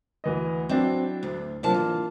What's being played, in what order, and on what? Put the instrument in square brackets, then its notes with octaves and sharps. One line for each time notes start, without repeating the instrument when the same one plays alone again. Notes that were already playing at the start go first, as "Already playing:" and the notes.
[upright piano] D2 E3 D#5
[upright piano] F#3 D4 E4 [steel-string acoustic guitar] C4
[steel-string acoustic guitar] D2
[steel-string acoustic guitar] C3 F#3 A5 [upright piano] A#3 D4 F4
[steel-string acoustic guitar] E3